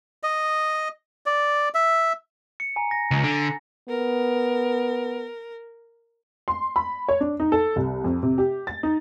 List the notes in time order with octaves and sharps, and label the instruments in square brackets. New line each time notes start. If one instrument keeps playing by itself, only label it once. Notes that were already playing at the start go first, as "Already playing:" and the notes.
[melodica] D#5
D5
E5
[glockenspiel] C#7
G#5 A#5
A#6
[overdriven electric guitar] C#2
D3
[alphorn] B3 [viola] A#4
[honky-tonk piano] C6
B5
C#5
D4
D#4
A4
C2
F2
C3
G4
A6
D#4